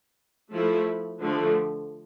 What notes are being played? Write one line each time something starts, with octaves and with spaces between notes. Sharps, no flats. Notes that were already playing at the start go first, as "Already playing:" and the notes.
F3 A3 E4
D3 F3 A3